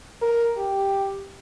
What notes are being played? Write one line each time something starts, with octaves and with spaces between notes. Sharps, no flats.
A#4
G4